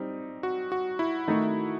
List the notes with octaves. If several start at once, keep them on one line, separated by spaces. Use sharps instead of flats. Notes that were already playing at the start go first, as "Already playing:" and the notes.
Already playing: G3 C4 D#4
F#4
F#4
E4
D#3 A3 D#4